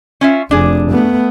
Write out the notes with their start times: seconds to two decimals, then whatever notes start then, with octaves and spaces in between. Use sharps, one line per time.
0.21 C#4 F4 E5
0.51 F1 D4 G#4
0.91 A3 B3